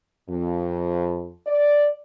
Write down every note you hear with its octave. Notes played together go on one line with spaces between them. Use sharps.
F2
D5